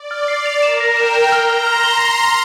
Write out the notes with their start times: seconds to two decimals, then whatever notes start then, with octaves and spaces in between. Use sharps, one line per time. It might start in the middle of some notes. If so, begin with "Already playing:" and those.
Already playing: D5
0.11 F6
0.28 D5 C7
0.46 F7
0.62 A#4 E7
0.80 A#6
0.97 G5 E7
1.15 E7
1.32 A#5 F6
1.50 F6
1.67 C6 F6
1.84 G7